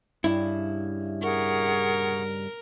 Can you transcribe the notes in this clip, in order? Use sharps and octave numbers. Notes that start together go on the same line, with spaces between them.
G2 C#3 E4
G#4 A#4 F#5 C#6